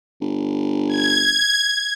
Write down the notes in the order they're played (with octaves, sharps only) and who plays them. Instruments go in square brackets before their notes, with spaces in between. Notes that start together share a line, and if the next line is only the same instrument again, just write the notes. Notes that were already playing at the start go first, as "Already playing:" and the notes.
[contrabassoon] G1
[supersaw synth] G#6